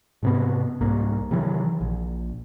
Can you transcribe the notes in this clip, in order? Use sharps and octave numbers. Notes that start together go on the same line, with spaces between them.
G#2 C3 B3
C2 G#2 A#3
C3 D#3 E3 F#3
A#1